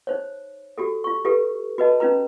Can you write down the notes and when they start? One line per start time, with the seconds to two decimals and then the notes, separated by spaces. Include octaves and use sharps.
0.07 D#4 C5 C#5
0.78 F#4 G4 A4
1.04 F4 C#6
1.25 F4 G4 A4 B4
1.78 F#4 B4 D#5 A5
2.00 C#4 D#4 F4 B4 A#5